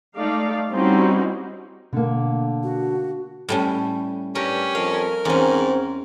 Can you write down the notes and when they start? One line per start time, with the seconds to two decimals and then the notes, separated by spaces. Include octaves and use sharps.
0.16 A3 D#4 D5 F5
0.70 G3 C4 C#4 D#4 E4 F#4
1.93 B2 D3 A#3
2.63 F#4
3.49 A2 G3 C#4
4.35 G2 C#4 G4 A#4
4.75 F2 A#4 F5
5.25 E2 G#2 C4 C#4